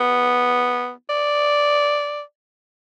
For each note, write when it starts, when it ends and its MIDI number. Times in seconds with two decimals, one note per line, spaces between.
0.01 0.91 59
1.09 2.21 74